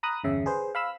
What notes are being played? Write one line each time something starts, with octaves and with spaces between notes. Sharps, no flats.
A#5 B5 D#6 F#6
G1 E2 C#3 E5
G#4 B4 C5
F5 B5 E6